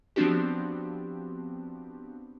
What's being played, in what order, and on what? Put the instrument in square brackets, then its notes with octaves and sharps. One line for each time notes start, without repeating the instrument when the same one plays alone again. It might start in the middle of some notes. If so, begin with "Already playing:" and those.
[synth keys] F3 B3 C4 D4 F#4 G4